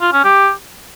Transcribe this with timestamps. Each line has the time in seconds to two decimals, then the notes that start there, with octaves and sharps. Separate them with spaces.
0.01 F4
0.13 C#4
0.24 G4